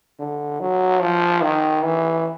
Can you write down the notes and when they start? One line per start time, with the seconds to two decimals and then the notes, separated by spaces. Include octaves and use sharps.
0.19 D3
0.60 F#3
1.01 F3
1.42 D#3
1.84 E3